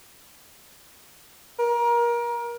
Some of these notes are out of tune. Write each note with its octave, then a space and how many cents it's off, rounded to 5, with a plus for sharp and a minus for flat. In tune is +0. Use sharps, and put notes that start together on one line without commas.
A#4 +25